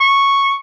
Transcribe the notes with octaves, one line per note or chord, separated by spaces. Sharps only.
C#6